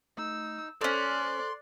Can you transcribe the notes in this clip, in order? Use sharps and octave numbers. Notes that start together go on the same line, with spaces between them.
A3 D#4 E6
C4 C#4 A4 C5 D5 C6 F#6